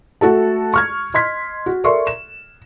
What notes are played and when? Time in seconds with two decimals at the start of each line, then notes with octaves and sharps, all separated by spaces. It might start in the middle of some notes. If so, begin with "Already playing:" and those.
0.21 A3 F#4 A4 A5
0.74 C#6 F6 G#6
1.14 D#5 C6 G#6 B6
1.66 F#4
1.84 A4 A#4 D5 E5 C6 C#6
2.07 E7